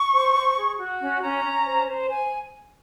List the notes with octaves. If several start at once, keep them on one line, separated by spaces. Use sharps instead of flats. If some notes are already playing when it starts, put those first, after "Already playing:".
Already playing: C#6
C5
C5
G#4
F#4
C#4
C#4 A#5
C#4
C5
C5
C5 G#5